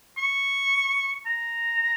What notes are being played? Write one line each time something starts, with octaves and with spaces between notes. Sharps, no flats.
C#6
A#5